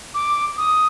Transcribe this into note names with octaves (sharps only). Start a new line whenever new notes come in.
D6
D#6